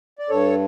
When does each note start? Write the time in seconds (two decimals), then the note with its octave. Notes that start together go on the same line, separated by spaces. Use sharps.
0.19 D5
0.29 G2 A4 C#5